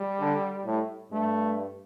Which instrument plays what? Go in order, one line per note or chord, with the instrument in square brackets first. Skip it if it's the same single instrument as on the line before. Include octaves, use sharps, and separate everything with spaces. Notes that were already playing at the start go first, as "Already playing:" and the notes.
Already playing: [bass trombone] G3
[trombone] D3
A2
[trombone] G2 [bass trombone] A3